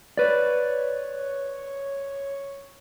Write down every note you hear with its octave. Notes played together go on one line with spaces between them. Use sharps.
B4 C#5 D5